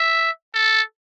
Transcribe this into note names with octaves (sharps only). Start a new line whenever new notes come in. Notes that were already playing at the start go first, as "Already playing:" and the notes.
Already playing: E5
A4